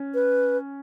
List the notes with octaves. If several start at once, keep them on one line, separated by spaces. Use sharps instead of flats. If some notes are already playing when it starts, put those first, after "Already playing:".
Already playing: C#4
B4